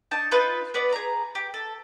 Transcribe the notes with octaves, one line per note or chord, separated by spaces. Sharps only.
D4 D#4 A5
D#4 F4 B4
B3 B4 D5
G#4 A#5
G4
A4